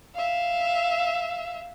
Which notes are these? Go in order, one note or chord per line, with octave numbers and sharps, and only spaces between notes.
E5 F5